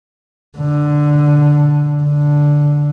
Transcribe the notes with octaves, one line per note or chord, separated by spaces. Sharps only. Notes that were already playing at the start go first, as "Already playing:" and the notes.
D3
D3